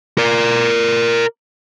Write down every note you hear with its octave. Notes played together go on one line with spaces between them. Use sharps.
A#4 D5